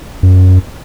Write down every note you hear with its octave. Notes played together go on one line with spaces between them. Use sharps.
F#2